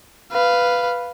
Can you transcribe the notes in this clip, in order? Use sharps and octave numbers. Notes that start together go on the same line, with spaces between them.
B4 F5